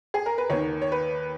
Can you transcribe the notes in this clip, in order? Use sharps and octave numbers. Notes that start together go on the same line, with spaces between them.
G#4
A#4
B4
D#2 D#3 C#5
C#5
B4